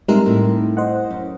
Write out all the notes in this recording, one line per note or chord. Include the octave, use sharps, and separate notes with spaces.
G3 G#3 C4 D#4 A#4 E5
A2 C4 E4
C5 D#5 F#5
F#2